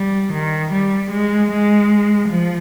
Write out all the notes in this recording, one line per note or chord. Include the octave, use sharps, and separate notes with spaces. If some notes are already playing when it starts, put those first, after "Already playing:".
Already playing: G3
D#3
G3
G#3
G#3
F3